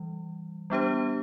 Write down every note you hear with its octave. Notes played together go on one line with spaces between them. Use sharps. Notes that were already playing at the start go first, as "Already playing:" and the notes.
Already playing: E3 G3
G3 B3 D4 G4 C5